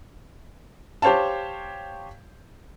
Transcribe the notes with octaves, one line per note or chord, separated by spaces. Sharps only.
G4 C5 C#5 F5 A5